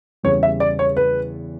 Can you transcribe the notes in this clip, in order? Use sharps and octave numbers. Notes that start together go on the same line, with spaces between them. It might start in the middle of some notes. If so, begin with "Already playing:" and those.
E2 C#3 G3 C#5
E5
D5
C#5
B4